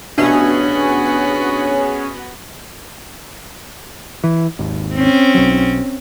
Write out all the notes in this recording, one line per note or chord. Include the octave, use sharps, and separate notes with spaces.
A1 B2 B3 C#4 D4 F#4 G#4 E5
E3
G#1 D#2
C4 C#4
B1 F#3